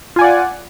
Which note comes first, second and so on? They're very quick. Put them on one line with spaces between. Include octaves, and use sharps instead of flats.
F4 G#5 D5 F#5